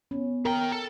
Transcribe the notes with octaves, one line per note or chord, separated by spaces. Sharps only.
B3 C#4
D#3 A#4 G5
A4